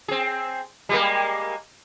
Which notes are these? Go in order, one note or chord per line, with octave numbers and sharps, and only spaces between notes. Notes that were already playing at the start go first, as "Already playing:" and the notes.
C4 G#4
G3 G#3 A#3